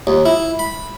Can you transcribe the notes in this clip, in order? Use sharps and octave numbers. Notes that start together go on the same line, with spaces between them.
D#2
E4
B5